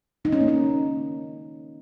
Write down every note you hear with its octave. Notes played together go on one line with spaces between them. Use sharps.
D#3 G#3 D#4
C#4
A#3
C#4